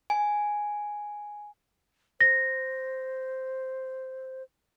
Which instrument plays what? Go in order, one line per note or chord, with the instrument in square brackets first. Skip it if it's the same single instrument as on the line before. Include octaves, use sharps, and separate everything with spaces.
[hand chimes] G#5
[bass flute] C5 [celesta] A#6